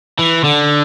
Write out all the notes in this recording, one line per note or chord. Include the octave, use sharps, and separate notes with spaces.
E3
D3